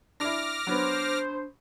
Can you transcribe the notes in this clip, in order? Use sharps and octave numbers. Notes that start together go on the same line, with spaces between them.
D4 E4 D6 F6 A#6
F#3 B3 D4 C5